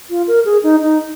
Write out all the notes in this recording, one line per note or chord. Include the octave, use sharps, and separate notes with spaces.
F4
A#4
G#4
D#4
D#4